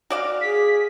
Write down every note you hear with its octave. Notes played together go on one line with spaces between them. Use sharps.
F#4 D5 F5
G#4 B6